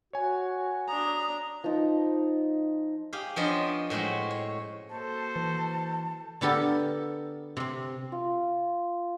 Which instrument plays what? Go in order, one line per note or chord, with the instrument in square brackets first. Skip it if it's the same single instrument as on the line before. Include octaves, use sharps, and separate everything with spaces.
[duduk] F#4 [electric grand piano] C#5 G#5
[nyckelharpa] D4 A#5 [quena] D#6
[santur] F3 D#4
[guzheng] G4 G#4 F5
F3 B3 C#4 D4 D#5 C6
A2 G#3 C4 F#4 C#5
C#5
[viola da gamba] A#3 F#4 A4 [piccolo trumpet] C5 [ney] A5
[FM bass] E3
[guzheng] D3 B3 G4 A4 A#4
C3 C4
[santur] F4